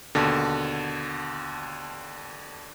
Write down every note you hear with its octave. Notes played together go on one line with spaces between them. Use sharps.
D#2 B2 D3